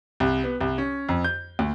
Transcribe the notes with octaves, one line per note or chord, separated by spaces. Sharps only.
C2
B3
C2
C#4
F2
G6
D2